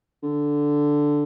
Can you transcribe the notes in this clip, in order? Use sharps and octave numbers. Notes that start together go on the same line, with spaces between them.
D3